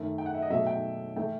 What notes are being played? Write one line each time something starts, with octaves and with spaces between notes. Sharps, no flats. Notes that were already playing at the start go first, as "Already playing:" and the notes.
Already playing: F#2 D#3 A3
G5
F#5
E5
D#5
B2 F#3 A3 E5
G5
E3 A3 G5